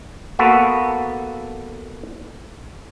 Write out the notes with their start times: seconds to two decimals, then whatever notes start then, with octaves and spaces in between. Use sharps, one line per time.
0.39 A#3 B3 F#4 A4 B4